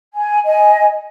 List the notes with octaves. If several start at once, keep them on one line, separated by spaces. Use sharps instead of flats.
G#5
D#5 G#5